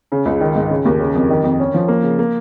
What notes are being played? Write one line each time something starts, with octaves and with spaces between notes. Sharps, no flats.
C#3
C#2
D#3
G#2
C#3
D#2
C#3
F2
D#3
F2
C#4
F3
A#3
C#3
A#3